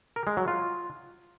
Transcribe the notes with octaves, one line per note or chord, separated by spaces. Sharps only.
A#4
G#3
F#3
F4